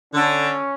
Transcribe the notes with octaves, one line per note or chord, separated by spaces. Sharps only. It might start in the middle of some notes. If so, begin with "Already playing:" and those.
D3 C#4